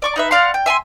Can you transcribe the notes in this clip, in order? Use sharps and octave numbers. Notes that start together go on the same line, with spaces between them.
D5 C#6 D6
D#4 B4 E5
D5 F5 F#5 C6
G5
E5 G#5 A#5 C6